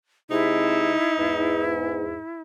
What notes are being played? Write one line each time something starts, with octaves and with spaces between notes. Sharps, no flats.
C3 G#3 D#4 E4
E2 G#2